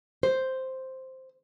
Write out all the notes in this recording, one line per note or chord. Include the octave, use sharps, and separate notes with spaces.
C5